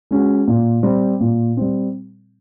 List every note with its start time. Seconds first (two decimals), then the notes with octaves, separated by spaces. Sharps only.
0.11 G#3 C#4 F#4
0.47 A#2
0.83 G3 C4
1.20 A#2
1.57 G3 C4